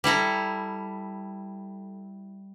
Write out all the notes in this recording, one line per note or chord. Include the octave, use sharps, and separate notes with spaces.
G3 E4 A4 A#5